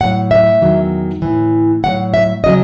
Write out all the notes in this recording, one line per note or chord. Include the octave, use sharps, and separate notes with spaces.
A2 F#3 F#5
E5
E2 D#3 F#3
A2 E3
A2 F#3 F#5
E5
C#3 F#3 D#5